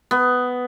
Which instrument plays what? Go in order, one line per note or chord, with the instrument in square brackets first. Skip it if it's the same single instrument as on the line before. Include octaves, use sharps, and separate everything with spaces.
[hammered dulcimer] B3